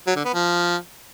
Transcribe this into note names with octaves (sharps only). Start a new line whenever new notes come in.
F#3
D3
B3
F3